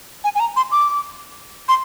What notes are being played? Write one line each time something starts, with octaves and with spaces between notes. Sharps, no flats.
G#5
G#5
A#5
C6
D6
C6